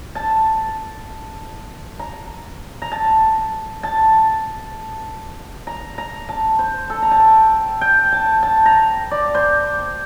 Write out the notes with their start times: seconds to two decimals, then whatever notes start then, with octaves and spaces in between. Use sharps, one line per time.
0.15 A5
1.99 A#5
2.82 A#5
2.92 A5
3.83 A5
5.67 A#5
5.98 A#5
6.29 A5
6.59 C5
6.90 A4
7.02 A#5
7.11 A5
7.20 G5
7.81 G5
8.12 A5
8.43 A5
8.66 A#5
9.11 D5
9.35 C5